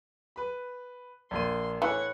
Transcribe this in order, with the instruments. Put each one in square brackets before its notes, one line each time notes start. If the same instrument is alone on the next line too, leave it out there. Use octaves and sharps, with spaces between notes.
[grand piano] B4 B5
[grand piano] A#1 A#3 D#7 [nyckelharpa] C6
[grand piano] A2 [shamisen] E3 [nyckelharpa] C#5 F#5